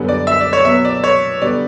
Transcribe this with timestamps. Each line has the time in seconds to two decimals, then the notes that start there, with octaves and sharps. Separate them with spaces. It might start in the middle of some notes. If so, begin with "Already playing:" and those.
Already playing: F#2 D3 G3 B3
0.09 D5
0.27 E5
0.41 D5
0.53 C#5
0.65 B2 F#3 B3 E5
0.85 D5
1.04 C#5
1.42 D3 G3 B3 D5